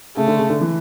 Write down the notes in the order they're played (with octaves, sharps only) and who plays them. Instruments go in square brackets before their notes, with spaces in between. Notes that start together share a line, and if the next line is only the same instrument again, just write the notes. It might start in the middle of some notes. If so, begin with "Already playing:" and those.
[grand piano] C#3 [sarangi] A3
[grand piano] D3
C#3
D3
E3